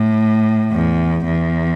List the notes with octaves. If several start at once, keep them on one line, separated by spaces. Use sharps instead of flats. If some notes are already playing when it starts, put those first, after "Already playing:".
Already playing: A2
E2
E2